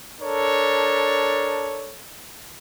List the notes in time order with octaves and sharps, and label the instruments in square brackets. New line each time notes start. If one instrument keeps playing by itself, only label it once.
[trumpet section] D4 A4 A#4 C#5